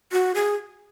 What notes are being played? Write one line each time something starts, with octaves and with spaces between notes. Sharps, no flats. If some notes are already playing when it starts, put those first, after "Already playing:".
F#4
G#4